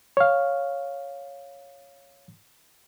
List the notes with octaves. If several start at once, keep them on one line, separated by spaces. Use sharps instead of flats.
C#5 F5